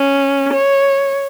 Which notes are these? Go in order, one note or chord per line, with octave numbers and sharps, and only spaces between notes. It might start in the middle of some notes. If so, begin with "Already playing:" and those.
Already playing: C#4
C#5